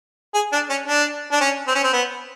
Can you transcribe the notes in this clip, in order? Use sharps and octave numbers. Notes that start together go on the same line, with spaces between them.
G#4
D4
C#4
D4
D4
C#4
C4
C#4
C4
B3